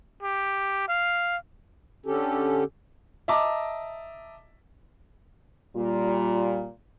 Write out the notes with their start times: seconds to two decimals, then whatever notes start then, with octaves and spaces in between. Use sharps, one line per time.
0.23 G4
0.88 F5
2.06 D3 C#4 G4 A4
3.28 D#5 E5 A5 A#5 D6
5.76 A#2 G3 F4